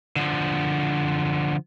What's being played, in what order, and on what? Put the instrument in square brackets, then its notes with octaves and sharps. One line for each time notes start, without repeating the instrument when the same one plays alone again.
[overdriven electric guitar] D3 F3